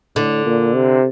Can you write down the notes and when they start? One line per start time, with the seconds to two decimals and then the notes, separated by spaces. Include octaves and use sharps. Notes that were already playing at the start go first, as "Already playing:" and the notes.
0.16 A2 D3
0.46 A#2
0.75 C3